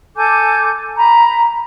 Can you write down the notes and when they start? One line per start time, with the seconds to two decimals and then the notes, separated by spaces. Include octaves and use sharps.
0.17 A4 G#5 D6 G6
0.98 A#5 B5